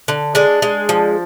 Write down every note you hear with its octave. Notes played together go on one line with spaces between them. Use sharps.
D3
G#3 D4
G#3
F3